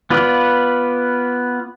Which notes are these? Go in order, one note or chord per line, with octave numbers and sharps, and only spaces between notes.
B3 F4 B4 D5